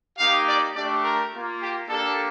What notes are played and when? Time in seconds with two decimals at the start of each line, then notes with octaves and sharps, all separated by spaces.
0.18 A#3 D#4 G4 F5
0.46 D5
0.75 A3 D4 G4 D5
1.03 A#4
1.33 A#3 F4
1.60 G4
1.89 A#3 D4 G4 A4